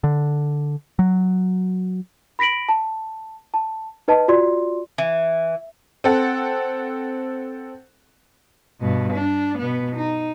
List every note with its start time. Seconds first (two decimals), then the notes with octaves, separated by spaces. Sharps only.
0.04 D3
0.99 F#3
2.39 B5 A#6 B6 D7 F#7
2.69 A5
3.54 A5
4.08 D#4 B4 D#5 A5
4.28 F4 F#4 D5 C6
4.98 E3
6.04 C4 A4 F#5
8.81 G2 B2
9.13 D4
9.58 B2 B3
9.96 D#4